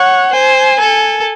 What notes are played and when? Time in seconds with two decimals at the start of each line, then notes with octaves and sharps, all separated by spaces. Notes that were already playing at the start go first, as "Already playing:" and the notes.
Already playing: C#5 F#5
0.32 C5 G#5
0.79 A4